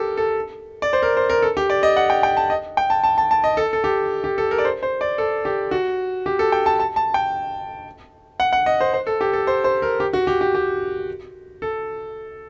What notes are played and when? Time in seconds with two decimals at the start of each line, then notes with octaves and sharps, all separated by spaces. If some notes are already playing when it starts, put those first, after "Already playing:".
Already playing: G4 A4 A#4
0.17 A4
0.82 D5
0.93 C5
1.02 A#4
1.17 C5
1.30 A#4
1.42 A4
1.57 G4
1.70 D5
1.83 D#5
1.97 F#5
2.10 G5
2.23 G5
2.37 A5
2.50 D#5
2.77 G5
2.90 A5
3.04 A5
3.18 A5
3.31 A5
3.44 D#5
3.57 A4
3.73 A4
3.84 G4
4.24 G4
4.38 A4
4.51 A#4
4.58 D5
4.65 C5
4.83 C5
5.01 D5
5.18 A4
5.45 G4
5.71 F#4
6.26 G4
6.39 A4
6.52 G5
6.66 A5
6.80 A5
6.96 A5
7.14 G5
8.40 F#5
8.53 F#5
8.66 D#5
8.80 C5
8.94 C5
9.07 A4
9.21 G4
9.33 A4
9.47 C5
9.64 C5
9.82 A#4
10.00 G4
10.13 F#4
10.27 G4
10.41 G4
10.55 G4
11.62 A4